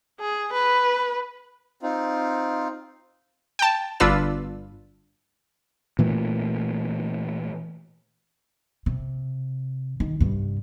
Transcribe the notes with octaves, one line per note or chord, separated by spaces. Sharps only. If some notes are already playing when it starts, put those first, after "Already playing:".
G#4
B4
C4 D#4 F4
G5 A5
G1 D4 F4 B4 E6
A#2 E3 A3
C3
D#3
G2 C3